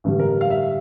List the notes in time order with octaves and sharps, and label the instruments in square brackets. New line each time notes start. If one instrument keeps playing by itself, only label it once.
[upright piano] A1 G2 D3 G3
A#4
F5
E5